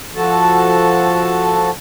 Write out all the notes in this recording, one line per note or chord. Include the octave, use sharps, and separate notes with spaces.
F3 F#4 A4 A5